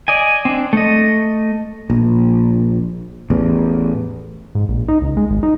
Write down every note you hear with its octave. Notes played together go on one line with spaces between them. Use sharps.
D5 D#5 G#5
C4 D4
A3 D#5
A#1
A1 E2
G#2
A#1
D#4
C#2
G#3
G#1
D#4